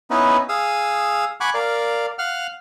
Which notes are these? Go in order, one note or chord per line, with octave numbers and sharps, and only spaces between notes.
B3 C#4 D#4 E4 B4
G#4 F5 D#6 E6
F#5 G#5 B5 C#6 D6
A#4 D5 F5
F5 F#5 F6